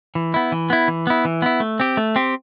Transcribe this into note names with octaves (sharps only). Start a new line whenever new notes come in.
E3
B3 E4
E3
B3 E4
E3
B3 E4
E3
B3 E4
A3
C4 G4
A3
C4 G4